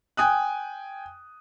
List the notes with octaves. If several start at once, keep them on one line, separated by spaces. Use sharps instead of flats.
G5 G#5 D#6 F#6